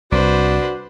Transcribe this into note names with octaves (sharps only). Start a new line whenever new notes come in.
C2 D4 F#4 B4 C5